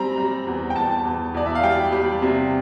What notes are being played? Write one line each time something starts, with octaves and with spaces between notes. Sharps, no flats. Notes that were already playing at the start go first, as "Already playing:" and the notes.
Already playing: G3 C4 A#5
G3
E2
G5
E2 A5
E2
E2 D5
E5
F5
G3 G5
G3
C3